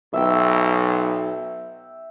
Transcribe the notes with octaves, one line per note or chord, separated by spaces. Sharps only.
B1 E5 G5